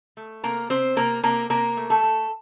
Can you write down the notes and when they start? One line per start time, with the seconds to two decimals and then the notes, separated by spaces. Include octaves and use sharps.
0.17 A3
0.44 C3 A#3 A#4
0.70 C3 C4 C5
0.97 C3 A#3 A#4
1.23 C3 A#3 A#4
1.50 C3 A#3 A#4
1.77 A3
1.90 A3 A4
2.03 A3